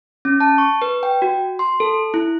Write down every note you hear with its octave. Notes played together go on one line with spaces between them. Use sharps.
C#4
A5
C#6
B4
G5
F#4
C6
A4
E4